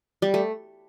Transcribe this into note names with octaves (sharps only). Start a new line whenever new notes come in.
G3
A3